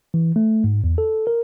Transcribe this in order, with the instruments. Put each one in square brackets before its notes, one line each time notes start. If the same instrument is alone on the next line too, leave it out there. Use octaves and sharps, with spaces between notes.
[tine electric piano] E3
A3
G#2
E2
A4
A#4